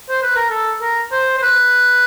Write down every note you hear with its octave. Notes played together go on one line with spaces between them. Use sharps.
C5
B4
A#4
A4
A#4
C5
C5
B4